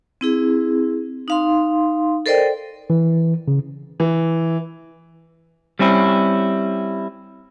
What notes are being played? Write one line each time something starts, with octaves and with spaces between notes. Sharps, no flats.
C4 E4 G#4
D#4 F5 C6
A4 A#4 C5 D5 D#5 G5
E3
C#3
E3
G3 C4 C#4 E4